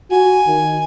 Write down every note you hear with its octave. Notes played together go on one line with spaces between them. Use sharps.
F#4 G#5
D#3